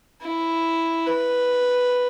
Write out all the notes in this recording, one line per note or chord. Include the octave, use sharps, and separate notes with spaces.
E4
B4